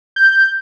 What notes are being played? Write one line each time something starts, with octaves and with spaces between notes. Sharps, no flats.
G6